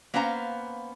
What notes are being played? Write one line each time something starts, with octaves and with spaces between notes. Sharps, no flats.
A#3 B3 C#4 C5 F5 A#5